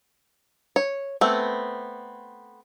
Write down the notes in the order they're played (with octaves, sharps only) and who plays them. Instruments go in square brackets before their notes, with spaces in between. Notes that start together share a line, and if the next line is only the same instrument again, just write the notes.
[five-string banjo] C#5
A3 B3 C4